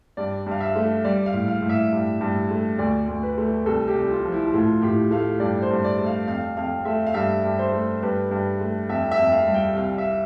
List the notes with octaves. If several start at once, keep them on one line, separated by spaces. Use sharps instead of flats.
G2 D5
G2 F5
E5
A3
G3 D5
F5
A2
F5
A2
E5
G2
G2
A3
D2 D5
D2
B4
A3
C2 A4
G4
C2
F4
F3
E4
A2 F4
A2 G4
A3 F5
G2 D5
C5
G2
D5
A3
F5
F2 F5
F2 F5
A3 E5
F5
G2 E5
G2
C5
A3
G2 B4
G2
A3
F2 E5
E5
F2
F5
G3
G5
C2 F5
E5